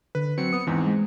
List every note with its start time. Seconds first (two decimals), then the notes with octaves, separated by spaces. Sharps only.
0.15 D3 B4
0.38 F#3 C4 C#7
0.53 B3 D#6
0.67 E2 G#2 E3 C4
0.86 G#3